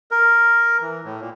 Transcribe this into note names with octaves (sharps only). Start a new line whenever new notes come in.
A#4
E3
A2
A#2